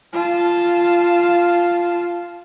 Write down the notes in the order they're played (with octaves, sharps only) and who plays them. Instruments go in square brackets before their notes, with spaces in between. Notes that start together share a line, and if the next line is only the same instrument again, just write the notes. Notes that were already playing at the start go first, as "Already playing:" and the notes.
[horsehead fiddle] F4 A5